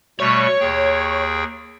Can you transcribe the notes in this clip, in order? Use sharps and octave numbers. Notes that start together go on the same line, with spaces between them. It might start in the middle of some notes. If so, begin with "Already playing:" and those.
B2 G3 A3 C#5
D#2 G#4 G5